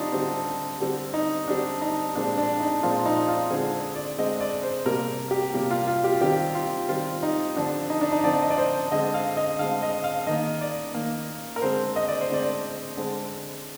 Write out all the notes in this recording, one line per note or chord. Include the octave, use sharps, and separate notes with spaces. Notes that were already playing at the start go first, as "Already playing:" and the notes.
Already playing: D3 G3 C4 D4 D#4 F4
D3 G3 C4
D3 G3 C4
D#4
D3 G3 C4 D4
D#4
A#2 F3 G#3 C4 D4
D4
D#4
A#2 F3 G#3 C4 F4
D#4
F4
D3 G#3 C4 G#4
D5
D3 G#3 C4 D#5
D5
C5
C3 G3 A#3 A#4
G4
C3 G3 A#3
F4
F4
G4
D#3 G3 C4 G4
F4
D#3 G3 C4 F4
D#4
D3 F3 C4 D4
D#4
D4
D#4
D3 F3 C4 D5
D#5
D5
C5
D3 G#3 C4 D#5
F5
D#5
D3 G#3 C4 F5
D#5
F5
D#3 A#3 D#5
D5
D#3 A#3
A#4
D3 G#3 C4 C5
D#5
D5
C5
D3 G#3 C4 D5
D3 G#3 C4